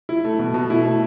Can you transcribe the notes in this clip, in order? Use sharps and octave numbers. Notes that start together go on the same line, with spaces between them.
E4
A3
B2
B2
E4
A3